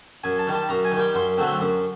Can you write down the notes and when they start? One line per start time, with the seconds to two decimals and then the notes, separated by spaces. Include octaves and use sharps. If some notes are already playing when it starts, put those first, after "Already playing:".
0.24 F#2 G#5
0.39 A5
0.47 D#3 G3
0.54 A5
0.69 F#2 A#5
0.85 G#5
0.92 D#3
0.97 G3 G5
1.15 F#2 C6
1.38 D3 F#3 A3 C4
1.60 F#2